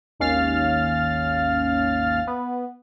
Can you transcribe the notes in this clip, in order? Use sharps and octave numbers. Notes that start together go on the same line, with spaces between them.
G#1 D#2 C#4 F5 F6 A6
B3